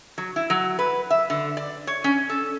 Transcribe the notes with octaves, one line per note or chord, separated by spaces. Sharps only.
F#3
E4
F#3
B4
E5
D3
D5
C#5
C#4
A4